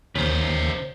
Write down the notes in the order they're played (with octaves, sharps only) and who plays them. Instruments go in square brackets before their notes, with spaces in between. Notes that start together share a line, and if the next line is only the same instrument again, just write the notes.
[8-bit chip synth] D#2 [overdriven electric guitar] C#3 C5